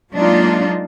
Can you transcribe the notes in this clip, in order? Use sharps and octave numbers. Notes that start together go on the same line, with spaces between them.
F#3 G#3 A#3 D4 D#4 F4